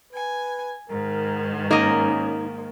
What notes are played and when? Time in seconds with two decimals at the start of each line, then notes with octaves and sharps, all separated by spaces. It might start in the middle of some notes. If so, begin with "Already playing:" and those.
0.13 B4 G#5
0.90 G#2 D#3 A#4
1.71 A#3 C#4 D#4 D#5